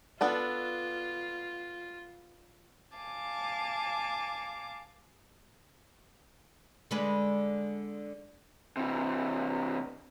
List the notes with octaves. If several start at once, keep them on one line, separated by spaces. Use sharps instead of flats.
B3 D4 F4 A4
F5 G#5 A5 D6
D3 G#3 B4
C3 E3